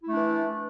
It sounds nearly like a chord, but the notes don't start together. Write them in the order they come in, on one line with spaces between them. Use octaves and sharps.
E4 A3 D4 E3